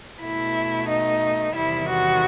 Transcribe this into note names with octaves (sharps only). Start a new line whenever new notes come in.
B2 A3 E4
D#4
E2 C3 D#3 G3 E4
F#4